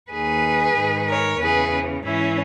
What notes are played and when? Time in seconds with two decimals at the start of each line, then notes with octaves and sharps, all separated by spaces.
0.12 D#2 D#3 G#4 B4
0.76 G#2 D#3
1.08 A#4 C#5
1.40 E2 C#3 E3 G#4 B4
2.04 G#2 E3 C#4 E4